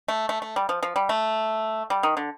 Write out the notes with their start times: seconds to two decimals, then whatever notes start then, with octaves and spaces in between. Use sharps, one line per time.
0.08 A3
0.29 A3
0.42 A3
0.56 G3
0.69 F3
0.83 F3
0.96 G3
1.09 A3
1.90 G3
2.03 D#3
2.17 D3